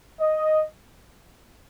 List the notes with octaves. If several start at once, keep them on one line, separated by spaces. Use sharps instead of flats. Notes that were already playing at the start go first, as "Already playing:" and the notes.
D#5